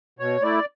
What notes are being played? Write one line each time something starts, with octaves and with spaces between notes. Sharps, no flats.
B2 C#5
A3 E4 D5